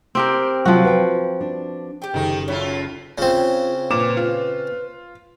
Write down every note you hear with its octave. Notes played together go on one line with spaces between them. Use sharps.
C4 G4 A#4
C3 F3 F#3 F#4
B4 G5
D4
G4 G5
F#1 D#3 D#4 A4 C#7
F#2 E4 F4 C#5
C#3 C4 F4
A#2 B4 D6 E7
F4